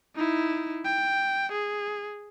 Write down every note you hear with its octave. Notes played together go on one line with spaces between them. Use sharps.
D#4 E4
G5
G#4